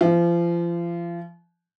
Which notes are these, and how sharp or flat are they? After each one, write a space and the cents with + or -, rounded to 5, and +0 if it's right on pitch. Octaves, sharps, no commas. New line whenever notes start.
F3 -35